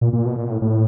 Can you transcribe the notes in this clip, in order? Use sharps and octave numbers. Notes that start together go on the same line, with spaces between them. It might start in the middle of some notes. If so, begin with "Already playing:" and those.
A#2
A#2
B2
A#2
A2
A2